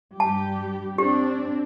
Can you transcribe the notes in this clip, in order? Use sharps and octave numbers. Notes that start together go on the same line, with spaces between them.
G2 G3 G4 A5
C4 D4 G4 D5